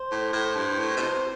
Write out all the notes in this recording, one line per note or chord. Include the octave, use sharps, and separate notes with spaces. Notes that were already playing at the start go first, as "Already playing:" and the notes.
Already playing: C5 C6
A2
A2
G2
A2
B2
C3